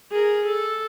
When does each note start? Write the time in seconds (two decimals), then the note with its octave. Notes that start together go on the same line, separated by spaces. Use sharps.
0.12 G#4 A#4
0.46 A4